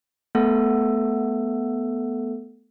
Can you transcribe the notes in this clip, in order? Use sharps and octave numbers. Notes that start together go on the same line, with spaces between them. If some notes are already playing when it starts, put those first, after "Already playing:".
A3 B3 A4